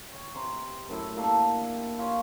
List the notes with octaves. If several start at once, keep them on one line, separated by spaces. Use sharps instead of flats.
C#5 G5
C3 A#5 C6
F#2 A2 E4
A#3 D4 G4 A4
G4 G5
F4 G4 C#5